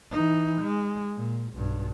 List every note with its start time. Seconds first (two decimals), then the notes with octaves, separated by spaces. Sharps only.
0.12 E3 D#4
0.61 G#3
1.16 A#2
1.53 B1 G2